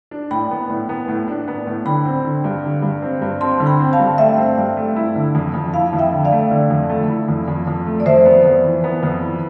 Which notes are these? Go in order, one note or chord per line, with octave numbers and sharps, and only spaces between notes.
D4
A2 G5 B5
B3
A2
B3
A2
D4
B3
A2
D3 G5 B5
C4
D3
G2
D3
G2
C4
G2
C4 A5 C6
D3
G5 B5
C4
F5 A5
G2
A3 E5 G5
C4
G2
A3
E4
D3
F2
F2
E4 F5 A5
F2
E5 G5
D3
D5 F5
A3
D3
F2
A3
E4
F2
F2
F2
A3
D5
F2 C5 E5
B3
F2
E3
B3
F2
E4